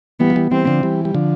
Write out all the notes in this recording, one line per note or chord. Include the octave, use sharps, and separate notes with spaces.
E3 G3 B3
F3
E3 G3
E3 G3 C4
D3 F3
E3 G3
G3
D3 F3